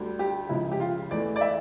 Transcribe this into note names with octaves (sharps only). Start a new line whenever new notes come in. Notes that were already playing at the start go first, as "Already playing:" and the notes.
Already playing: D2 D3 G3
G4
C#2 C#3 F3 E4
G4
F4
E2 E3 A3 D5
D5
E5